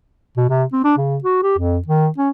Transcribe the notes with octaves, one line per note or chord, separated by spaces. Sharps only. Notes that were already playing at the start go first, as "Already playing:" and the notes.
B2
C3
C4
D4
C#3
F#4
G4
F2
D#3
C#4